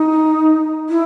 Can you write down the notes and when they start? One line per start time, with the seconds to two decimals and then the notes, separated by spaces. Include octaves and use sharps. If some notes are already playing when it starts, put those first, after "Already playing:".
Already playing: D#4
0.89 E4